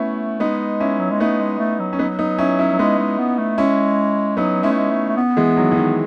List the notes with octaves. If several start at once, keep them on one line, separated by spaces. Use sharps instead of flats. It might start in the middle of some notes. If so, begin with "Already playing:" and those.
Already playing: A3 B3 C#4 E4
G#3 B3 D#4
C#4 E4
F#3
G#3
A3 B3 D#4
G#3
A3
F#3
C#4
F#3 B3 D#4
B3 D#4
C#4 E4
C#4 E4
F#3
G#3 B3 D#4
G#3
B3
A3
G#3 C#4 E4
F#3 B3 D#4
G#3 C#4 E4
A3
G#3
A3
A3
B3
E3 G#3
D#3 F#3
E3
D#3